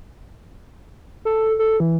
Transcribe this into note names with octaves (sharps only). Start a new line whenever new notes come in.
A4
A4
E3